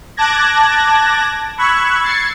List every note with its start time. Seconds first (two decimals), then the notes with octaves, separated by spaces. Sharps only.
0.17 A5 D6 F#6 G#6 A#6
1.58 B5 C#6 E6 F#6 G#6
2.02 G#6 A6 C7 C#7